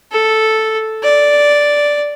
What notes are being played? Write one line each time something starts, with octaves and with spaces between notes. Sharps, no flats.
A4
D5